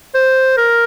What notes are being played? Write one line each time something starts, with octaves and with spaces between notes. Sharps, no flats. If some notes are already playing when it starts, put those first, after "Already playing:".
C5
A#4